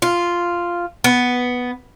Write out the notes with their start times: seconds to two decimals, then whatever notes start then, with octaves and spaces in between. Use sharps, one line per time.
0.02 F4
1.04 B3